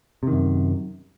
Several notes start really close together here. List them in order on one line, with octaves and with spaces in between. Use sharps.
C3 D#3 F#2